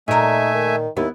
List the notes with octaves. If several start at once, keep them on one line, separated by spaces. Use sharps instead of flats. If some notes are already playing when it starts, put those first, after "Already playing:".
A#2 A3 D#4 A#4 E5 G#5
D#3
D#2 B3 E4